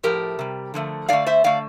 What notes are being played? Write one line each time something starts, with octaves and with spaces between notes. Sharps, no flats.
A2 F3 A3 G4 A#4
C3 G3
D3 F3 A3
D3 A3 D5 F5
C5 E5
D3 A3 D5 F5